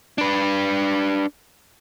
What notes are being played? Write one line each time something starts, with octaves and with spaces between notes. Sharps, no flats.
D4 B4